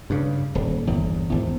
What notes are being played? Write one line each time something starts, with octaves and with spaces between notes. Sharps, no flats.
G2 C#3
D#1
G1 E2
G#1 E2